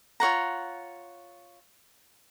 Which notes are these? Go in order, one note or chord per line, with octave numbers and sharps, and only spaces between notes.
F4 C#5 F#5 A#5